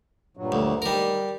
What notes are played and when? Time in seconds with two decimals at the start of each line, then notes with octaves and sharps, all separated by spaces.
0.37 G2 A#2 F#3
0.52 D2
0.82 D#3 G3 A#4